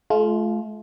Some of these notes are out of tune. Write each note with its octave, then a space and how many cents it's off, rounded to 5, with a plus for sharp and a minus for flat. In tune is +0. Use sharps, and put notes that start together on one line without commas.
A3 -40 F4 +0